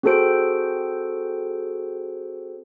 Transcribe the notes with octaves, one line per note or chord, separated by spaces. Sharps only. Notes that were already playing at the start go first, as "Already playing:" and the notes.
C4 F#4 G#4 A4 C5 D7